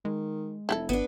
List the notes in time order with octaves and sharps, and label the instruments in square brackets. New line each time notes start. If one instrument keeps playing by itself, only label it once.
[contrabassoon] D#3 [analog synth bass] G#3
[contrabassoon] F1 [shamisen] E4 G4 A4
[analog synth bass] G#1 [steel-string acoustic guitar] B3 D4